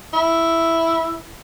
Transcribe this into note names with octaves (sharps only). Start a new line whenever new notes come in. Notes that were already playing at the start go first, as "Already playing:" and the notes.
E4